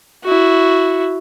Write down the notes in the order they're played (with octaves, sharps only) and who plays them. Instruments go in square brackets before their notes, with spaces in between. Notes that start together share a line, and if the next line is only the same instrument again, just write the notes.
[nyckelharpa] E4 F#4